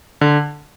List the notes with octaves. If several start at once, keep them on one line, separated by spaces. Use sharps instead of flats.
D3